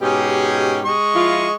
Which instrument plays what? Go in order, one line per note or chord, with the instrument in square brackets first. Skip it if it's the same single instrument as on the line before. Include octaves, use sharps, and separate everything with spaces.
[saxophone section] G#2 B2 G4 [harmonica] C#4 G#4
[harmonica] G#3 D#5 C#6
[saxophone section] F3 E4 F4